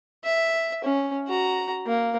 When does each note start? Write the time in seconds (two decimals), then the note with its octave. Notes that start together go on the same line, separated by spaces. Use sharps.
0.25 E5
0.84 C#4
1.28 F#4 A#5
1.87 A#3